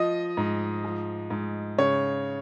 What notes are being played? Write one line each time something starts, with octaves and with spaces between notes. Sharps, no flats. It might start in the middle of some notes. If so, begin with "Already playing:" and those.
Already playing: F3 D#5
G#2
F3
G#2
C#3 C#5